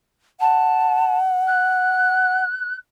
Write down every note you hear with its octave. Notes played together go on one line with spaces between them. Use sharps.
F#5 A5
F#6